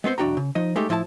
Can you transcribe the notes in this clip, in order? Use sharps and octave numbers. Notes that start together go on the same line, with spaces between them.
G#3 B3 C4 C5
B1 E2 D4 F#4 G5 A#5
C#3
F3 D#4 D#5
G#3 A3 D#4 G4
A2 F3 E4 C#5 A5